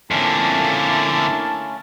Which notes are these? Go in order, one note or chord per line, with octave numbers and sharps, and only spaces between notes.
F2 D3 A3 A#3 C#4 E4 A5 F6